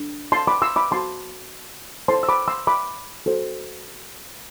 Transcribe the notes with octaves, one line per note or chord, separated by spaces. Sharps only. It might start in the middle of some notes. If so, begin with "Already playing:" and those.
Already playing: D4
A5 C6
B5 D6
C6 E6
B5 D6
F#4 C5 A5 C6
E4 A4 C5 A5 C6
E6
B5 D6
C6 E6
B5 D6
F#4 A4 C5